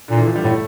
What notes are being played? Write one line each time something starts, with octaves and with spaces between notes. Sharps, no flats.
A#2 D3
E3
F3
G3
A2 A3